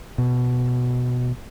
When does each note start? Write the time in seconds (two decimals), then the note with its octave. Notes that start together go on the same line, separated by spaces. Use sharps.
0.18 B2